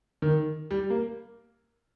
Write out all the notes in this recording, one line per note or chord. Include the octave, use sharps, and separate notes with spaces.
D#3
G3
A#3